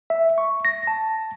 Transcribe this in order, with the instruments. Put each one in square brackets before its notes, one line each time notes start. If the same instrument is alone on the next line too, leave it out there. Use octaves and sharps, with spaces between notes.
[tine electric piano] E5
C#6
A#6
A5